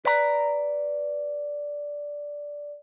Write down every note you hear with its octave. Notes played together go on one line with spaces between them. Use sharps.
B4 D5 A#5